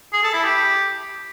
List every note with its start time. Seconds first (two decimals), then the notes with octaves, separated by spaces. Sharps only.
0.13 G#4
0.23 A4
0.34 E4
0.44 G4